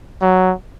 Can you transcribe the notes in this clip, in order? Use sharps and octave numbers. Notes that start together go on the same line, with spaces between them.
F#3